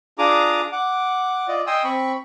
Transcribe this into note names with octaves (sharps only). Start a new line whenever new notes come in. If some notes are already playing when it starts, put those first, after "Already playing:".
D4 F4 G#4 A#5 D6 D#6
F#5 D6
F4 D5 D#5
D#5 G5 G#5 C6 D#6 E6
C4 B5 C#6